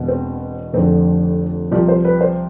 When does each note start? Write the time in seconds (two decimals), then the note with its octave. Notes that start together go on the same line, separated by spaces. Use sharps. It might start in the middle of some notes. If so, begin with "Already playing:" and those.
Already playing: E1 E2 B2
0.08 C4
0.74 F1 F2 D3 C4
1.71 C2 C3 F3
1.88 C5
2.05 B4
2.21 C5